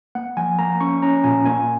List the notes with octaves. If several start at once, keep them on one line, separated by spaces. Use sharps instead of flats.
A#3 F#5
F3 G#5
A#3 A#5
C#4 C#6
C#4 A#5
A#2 G#5
A#3 G#5